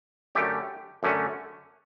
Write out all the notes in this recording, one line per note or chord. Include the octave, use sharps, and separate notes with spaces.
F#2 D3 A3 C#4 G4
F#2 D3 A3 C#4